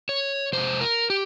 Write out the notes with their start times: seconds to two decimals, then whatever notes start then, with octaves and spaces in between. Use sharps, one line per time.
0.09 C#5
0.53 F2 C3 G#3 C5
0.81 A#4
1.10 G4